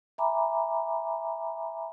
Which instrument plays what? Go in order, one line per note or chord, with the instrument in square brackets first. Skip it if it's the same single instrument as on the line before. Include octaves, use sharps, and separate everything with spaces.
[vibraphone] E5 G#5 A#5 B5 D6